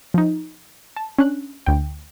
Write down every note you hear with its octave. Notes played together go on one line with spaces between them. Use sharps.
F3 D#4
A5
C#4 D4 F#6
D2 G5